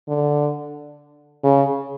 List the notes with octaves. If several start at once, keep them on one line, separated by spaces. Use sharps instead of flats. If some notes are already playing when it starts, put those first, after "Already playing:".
D3
C#3